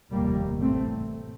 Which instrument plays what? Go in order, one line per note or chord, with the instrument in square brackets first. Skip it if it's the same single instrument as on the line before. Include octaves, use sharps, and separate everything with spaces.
[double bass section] F1 D#2 G3 A#3
A1 A2 A3 C4